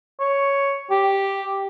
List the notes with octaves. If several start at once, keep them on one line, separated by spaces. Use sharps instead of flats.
C#5
G4